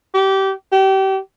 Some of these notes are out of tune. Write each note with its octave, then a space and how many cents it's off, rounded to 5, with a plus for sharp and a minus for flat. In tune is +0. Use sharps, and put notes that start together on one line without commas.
G4 -25
G4 -30